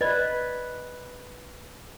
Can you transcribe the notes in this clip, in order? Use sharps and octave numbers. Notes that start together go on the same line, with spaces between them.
B4 D5 D#5